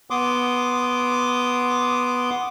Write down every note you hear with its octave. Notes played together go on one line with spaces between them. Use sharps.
B3 C6 D6 D#6